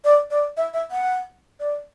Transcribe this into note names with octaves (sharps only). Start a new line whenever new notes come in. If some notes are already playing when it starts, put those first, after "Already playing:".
D5
D5
E5
E5
F#5
D5